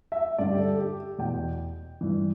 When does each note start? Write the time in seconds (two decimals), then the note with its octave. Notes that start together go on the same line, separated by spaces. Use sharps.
0.12 E5
0.38 G2 D3 D5
0.51 G4
0.58 A4
0.78 G4
1.19 E2 B2 G5
2.01 G2 E3